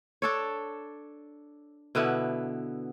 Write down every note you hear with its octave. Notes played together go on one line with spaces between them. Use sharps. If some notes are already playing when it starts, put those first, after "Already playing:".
D4 A4 C#5
B2 D3 B3 E4